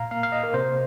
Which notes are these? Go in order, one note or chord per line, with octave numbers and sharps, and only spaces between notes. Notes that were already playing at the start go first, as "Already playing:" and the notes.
Already playing: A#2 F5 A#5
A#3 F5
F5
D#5
A#4
C3 C5